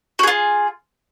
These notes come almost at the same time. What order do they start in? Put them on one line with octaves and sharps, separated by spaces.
F#4 G#4 F4